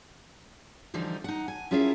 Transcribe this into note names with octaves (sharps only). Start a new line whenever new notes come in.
D3 E3 F3 G3 D#4
D#4 F#5
G#5
C#4 E4 F4 G#4 A#4 E5